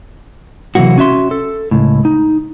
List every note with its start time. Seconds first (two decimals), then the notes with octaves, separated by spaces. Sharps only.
0.75 C3 E3 F#3 A#3 F#4
0.98 C#4 F#4 E5 C6
1.31 A4
1.71 C#2 A2
2.05 D#4